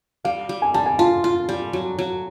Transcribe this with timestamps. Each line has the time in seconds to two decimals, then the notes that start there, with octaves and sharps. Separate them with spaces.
0.25 G3 F5
0.49 G3
0.62 G#5
0.74 G3 A5
0.86 G#5
0.99 F4 A5
1.24 F4
1.49 G3
1.73 F#3
1.99 F#3